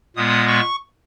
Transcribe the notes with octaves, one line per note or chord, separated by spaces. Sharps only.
A#2 G#3 B3 D#6
C#6